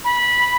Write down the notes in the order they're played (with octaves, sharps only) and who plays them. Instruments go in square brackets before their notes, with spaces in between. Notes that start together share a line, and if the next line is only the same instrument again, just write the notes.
[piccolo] B5